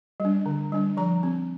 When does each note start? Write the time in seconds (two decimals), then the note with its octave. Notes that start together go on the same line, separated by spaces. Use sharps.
0.20 G3
0.25 D4
0.46 D3
0.72 G3 D4
0.97 F3 A#5
1.23 C4